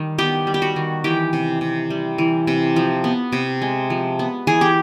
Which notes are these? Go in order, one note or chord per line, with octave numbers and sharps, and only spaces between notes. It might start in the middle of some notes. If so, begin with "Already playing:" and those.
Already playing: D#3 G3
B3 G4
G3
G4
F#4
D#3
E3 G4
C3
C3
G3
E3
C3
F3
B3
C3
G#3
F3
B3
E3 G#4
G4